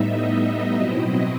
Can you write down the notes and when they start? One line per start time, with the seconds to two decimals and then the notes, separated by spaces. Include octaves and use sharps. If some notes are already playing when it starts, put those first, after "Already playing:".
Already playing: A2 G3 B3 D#4 E5
0.09 D#5
0.41 D#5
0.74 B2 F#3 C4 E4 D#5
1.07 D#5